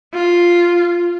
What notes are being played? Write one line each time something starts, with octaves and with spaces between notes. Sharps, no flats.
F4